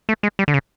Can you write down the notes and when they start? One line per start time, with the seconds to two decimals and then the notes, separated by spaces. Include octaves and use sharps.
0.09 A3
0.23 G#3
0.39 G3
0.48 D3
0.54 C#3